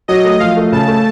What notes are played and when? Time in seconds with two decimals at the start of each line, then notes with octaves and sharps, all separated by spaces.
0.08 F#3 D#5
0.24 A3
0.40 F3 F5
0.57 A3
0.72 C#3 A5
0.88 A3